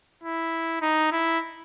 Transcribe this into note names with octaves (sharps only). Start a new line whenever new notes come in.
E4
D#4
E4